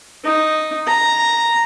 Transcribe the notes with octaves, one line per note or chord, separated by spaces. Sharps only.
D#4
A#5